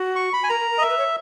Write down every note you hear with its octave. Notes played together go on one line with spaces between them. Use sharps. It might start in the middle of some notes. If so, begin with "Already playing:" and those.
Already playing: F#4
C#6
B5
G#5
A#4 A#5
A#4
A#4
D#5
A#4 E5
B4
C#5